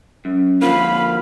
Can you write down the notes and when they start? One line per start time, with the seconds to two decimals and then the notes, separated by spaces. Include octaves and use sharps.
0.25 F#2
0.62 D3 F3 A#3 F5 B5